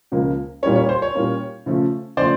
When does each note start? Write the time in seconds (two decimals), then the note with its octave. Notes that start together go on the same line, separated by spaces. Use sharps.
0.12 C#2 C#3 F3 A#3
0.63 A#2 G3 A#3 C#4 C#5
0.76 C#5
0.89 C5
1.02 C#5
1.15 A#2 G3 A#3 C#4
1.66 C#3 F3 A3
2.17 C#3 F3 A3 C5 D5